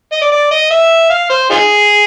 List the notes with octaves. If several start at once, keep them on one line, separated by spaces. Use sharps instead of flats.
D#5
D5
D5
D#5
E5
F5
C5
D#4 F4 G#4